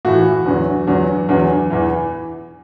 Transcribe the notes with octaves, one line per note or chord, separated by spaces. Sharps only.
A2 E3 F#4
E2 D3 F#3
E2 D3 F#3
E2 D3 F#3
E2 E3